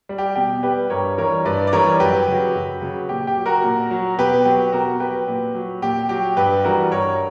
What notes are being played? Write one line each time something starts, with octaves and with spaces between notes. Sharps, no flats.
G3
G4
B2 G4
G3 G4 B4
G2 A#4 C#5
E3 G3 A#4 C#5
G2 B4 D5
D5
E3 G3 A#4 C#5
F#2 G4 B4
C#3 F#3
F#2
C#3 F#3
A#2 G4
G4
F#3
F#4 A#4
A#2
F#3
B2 G4 B4
F#3 G4
B2 F#4 A#4
F#3 G4 B4
A#2
F#3
A#2 G4
F#3 G4
G2 G4 B4
E3 G3 F#4 A#4
G2 A#4 C#5